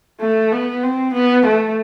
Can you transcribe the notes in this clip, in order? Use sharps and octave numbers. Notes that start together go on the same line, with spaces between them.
A3
B3
C4
B3
A3